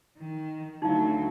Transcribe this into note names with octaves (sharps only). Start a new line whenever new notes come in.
D#3
D2 F#3 D#4 E4 F5